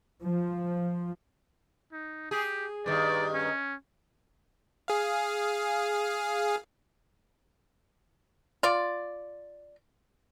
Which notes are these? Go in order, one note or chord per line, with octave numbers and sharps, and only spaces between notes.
F3
D#4
G4 G#4
G2 D#3 D5
C#4
G#4 F5
F4 D5